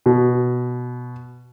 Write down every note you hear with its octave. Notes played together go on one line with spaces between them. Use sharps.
B2